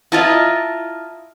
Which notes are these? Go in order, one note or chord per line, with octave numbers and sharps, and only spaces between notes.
E4 F4 D#5 A5 A#5